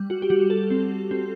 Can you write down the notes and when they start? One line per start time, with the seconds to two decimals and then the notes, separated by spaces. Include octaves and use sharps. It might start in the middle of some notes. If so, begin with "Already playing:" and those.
Already playing: G3
0.10 F#4
0.22 G4
0.30 G3 F#4
0.50 A4
0.70 C4
1.11 C4